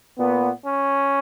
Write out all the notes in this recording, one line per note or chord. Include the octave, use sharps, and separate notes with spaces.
A#2 B3
C#4